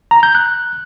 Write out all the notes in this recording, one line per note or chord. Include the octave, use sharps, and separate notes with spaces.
A#5
G6
F#6